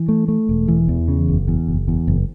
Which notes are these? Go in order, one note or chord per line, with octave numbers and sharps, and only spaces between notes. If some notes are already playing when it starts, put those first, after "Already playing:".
Already playing: E3
A3
A3
E1
E3
E2
C#3
F#1
E2
F#1
E2
F#1